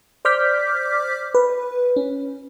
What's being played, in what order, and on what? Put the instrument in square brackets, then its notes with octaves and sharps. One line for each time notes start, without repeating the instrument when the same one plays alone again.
[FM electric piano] C5 D5 D6 F6 G6 B6
B4
C#4